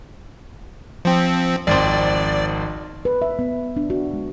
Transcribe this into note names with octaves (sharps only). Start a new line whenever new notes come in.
F3 C4
G#1 F2 C4 D5
B4
E5
B3
D4
F#4
G#3